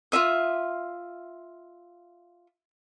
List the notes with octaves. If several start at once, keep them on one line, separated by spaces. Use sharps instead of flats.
F4 C5 E5 D#6